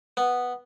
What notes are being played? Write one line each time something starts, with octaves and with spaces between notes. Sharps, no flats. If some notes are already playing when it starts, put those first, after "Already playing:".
B3